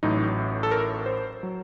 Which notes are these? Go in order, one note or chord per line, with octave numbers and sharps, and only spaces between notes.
A1 A2 F#3 D#4
A4
A#4
C5
F#3